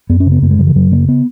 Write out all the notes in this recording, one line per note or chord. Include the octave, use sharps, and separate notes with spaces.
F#2 B3
C#4
C#3
B3
F#2 A#3
G#3
C#3 F#3
E3
F#2 F#3
C#3 A#3
B3